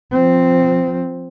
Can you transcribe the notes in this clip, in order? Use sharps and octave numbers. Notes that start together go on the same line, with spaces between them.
F3 C4